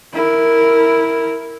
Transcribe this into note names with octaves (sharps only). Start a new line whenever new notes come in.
E4 A#4